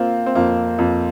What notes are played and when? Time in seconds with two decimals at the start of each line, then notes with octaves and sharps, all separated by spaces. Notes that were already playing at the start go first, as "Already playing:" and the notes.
Already playing: A#3 C4 F4
0.26 C4
0.35 F2 A#3
0.79 F2